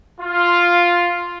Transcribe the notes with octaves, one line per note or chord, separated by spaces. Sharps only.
F4